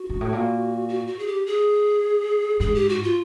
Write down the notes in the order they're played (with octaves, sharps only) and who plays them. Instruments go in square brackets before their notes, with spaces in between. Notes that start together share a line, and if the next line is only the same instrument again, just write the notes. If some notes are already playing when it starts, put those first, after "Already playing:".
Already playing: [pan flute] F#4
[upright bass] G#2
A2
A#2
[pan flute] F#4
F#4
G#4
G4
G#4
[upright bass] G#2 [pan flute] G#4
[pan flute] G4
F#4
F4